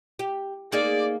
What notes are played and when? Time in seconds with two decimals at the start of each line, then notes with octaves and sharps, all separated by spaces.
0.19 G4
0.72 A#3 D#4 G#4 D5